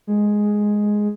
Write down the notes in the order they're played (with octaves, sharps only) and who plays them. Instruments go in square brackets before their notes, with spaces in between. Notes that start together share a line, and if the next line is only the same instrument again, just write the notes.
[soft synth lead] G#3